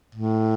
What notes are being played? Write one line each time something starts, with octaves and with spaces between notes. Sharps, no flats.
A2